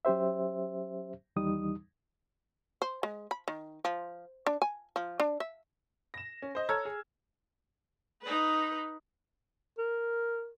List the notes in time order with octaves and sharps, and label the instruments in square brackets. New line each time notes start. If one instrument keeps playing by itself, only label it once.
[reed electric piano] F#3 C#4 G4 C5 E5
D#2 E3 G3 D#4 D#6
[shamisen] C5
G#3
B5
D#3
F3
D4
G#5
F3
D4
E5
[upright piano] A#6 E7
C#4
C5 D#5
A4 C#5 A#5 E6 F6 G#6
G#4
[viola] D#4 B4
[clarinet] A#4